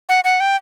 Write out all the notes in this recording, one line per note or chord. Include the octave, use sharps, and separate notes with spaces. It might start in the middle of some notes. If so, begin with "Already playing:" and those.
F#5
F#5
G5